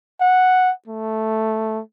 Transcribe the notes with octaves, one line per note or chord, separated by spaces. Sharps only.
F#5
A3